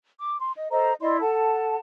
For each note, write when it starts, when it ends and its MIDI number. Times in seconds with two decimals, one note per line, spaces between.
0.18 0.37 86
0.38 0.51 84
0.55 0.66 75
0.70 0.93 69
0.70 0.93 72
0.70 0.93 75
0.70 0.93 82
1.00 1.19 64
1.00 1.19 74
1.00 1.19 75
1.00 1.19 84
1.21 1.77 69
1.21 1.77 78
1.21 1.77 81